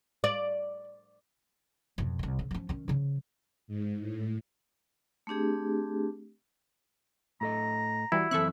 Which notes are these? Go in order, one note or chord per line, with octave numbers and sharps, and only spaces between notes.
D5
F2 B2
C2 D#3
C#3
F3 C#4
D#3 C#4
C#3 F3
G#2
A2
A3 C4 D4 G4 G#4
A2 A4 D#5 A#5
E3 G3 E4 F#4
F#2 E3 C4 A4 E5 C#6 F#6